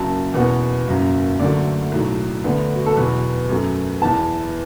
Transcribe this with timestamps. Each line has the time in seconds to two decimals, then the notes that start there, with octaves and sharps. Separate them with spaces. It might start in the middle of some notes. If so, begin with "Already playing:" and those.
Already playing: F#1 F#2 F#3 A5
0.34 E2 B2 B3 F#5
0.87 F#1 F#2 F#3
1.40 D2 D3 F#3 A3 D5
1.92 B1 A2 F#3
2.44 D2 D3 B3
2.75 F#4
2.86 A4
2.97 E2 B2 F#3 B3 B4
3.49 F#2 F#3 A3
4.02 E2 E3 B3 A5